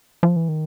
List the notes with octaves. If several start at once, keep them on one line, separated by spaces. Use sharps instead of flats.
F3
E3
D#3